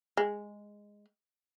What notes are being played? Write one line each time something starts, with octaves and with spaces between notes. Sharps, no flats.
G#3